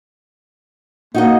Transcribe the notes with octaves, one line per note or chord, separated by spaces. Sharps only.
A#3 D#4 F#4 D#5